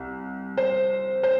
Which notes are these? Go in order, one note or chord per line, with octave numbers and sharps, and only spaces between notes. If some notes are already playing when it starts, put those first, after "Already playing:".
Already playing: C2
C5
C5